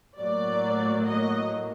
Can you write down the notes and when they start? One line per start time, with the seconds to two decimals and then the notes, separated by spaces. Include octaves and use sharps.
0.18 A2 F#3 A#3 D5
1.04 D#5